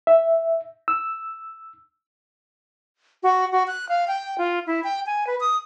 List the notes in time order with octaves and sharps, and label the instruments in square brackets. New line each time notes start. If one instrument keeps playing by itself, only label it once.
[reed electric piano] E5
E6
[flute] F#4
F#4
F#6
F5
G5
F4
E4
G5
G#5
B4
D#6